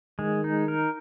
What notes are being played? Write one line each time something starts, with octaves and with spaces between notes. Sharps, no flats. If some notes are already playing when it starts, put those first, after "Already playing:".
D#3 G#3
D#4
A#4